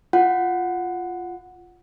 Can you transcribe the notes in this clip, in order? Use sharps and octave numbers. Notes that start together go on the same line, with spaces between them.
F4 F#5